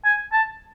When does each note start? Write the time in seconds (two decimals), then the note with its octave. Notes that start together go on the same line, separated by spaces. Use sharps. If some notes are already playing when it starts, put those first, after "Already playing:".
0.05 G#5
0.33 A5